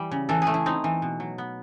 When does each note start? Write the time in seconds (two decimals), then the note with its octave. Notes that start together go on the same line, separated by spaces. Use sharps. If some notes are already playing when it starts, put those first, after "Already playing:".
Already playing: E3 G3
0.11 C#3
0.29 E3 A4
0.42 G#4
0.47 A3
0.54 E4
0.66 C4 D#4
0.84 E3
1.02 B2
1.20 F#3
1.38 B3